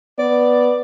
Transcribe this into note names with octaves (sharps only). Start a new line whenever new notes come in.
B3 D5